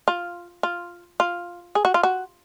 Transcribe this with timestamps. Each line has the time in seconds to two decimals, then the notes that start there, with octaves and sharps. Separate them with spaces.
0.08 F4
0.63 F4
1.20 F4
1.75 G#4
1.85 F#4
1.94 F4
2.03 F#4